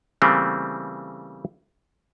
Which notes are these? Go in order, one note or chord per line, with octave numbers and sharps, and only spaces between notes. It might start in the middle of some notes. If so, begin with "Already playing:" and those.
C#3 E3 G3 A3 A#3 C4